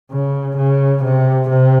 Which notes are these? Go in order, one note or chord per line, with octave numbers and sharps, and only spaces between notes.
C#3
C#3
C3
C3